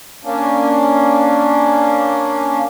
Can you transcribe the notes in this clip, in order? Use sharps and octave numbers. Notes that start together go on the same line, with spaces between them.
A#3 C#4 D4